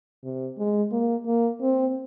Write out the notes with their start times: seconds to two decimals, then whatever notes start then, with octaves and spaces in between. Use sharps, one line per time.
0.24 C3
0.58 G#3
0.92 A#3
1.26 A#3
1.61 C4